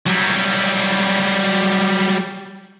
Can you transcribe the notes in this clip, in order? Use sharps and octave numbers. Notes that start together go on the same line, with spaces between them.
F#3 G3